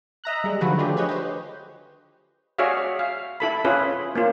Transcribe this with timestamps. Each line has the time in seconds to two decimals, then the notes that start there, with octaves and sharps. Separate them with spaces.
0.24 D#5 E5 A#5 F#6
0.44 G3 G#3
0.61 D3 D#3 F3 F#3 F#4 B4
0.78 A3 D4 F4 G4 G#4
0.97 B4 C#5 D#5
1.09 G4 C5
2.58 F#4 G#4 C#5 D5 E5 F5
2.99 F5
3.40 E4 A4 B5
3.64 C#4 E4 F4 G#4 B4
4.15 A#3 C#4 F4